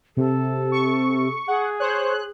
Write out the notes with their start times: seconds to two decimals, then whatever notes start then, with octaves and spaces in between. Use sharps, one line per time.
0.17 C3 A4
0.72 C#6
1.48 G#4 F#5
1.80 C5 C#5 F#6